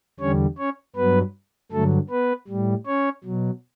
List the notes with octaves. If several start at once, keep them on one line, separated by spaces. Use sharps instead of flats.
E2 D3 G3 C#4 C#5
C#4 C#5
G2 F#3 B3 B4
G2 D3 F#3 A3 A4
B3 B4
A2 G3
C#4 C#5
B2 F#3